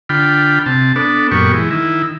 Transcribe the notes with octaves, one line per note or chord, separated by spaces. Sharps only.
D3 F4 G5 B5
C3 A5
B3 D4 A4
F#2 A#2 B3 G4 C#6
E3 G#3
D#3 E4